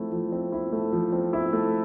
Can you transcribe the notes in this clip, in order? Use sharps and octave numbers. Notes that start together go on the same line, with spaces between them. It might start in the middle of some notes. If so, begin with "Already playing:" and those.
Already playing: F3 A3 C4 E4
F3
C4
E4
A3
F3
C4
E4
A3